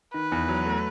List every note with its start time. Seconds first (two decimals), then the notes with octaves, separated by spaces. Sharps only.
0.14 D#3 B4
0.32 E2
0.48 F#3
0.66 A3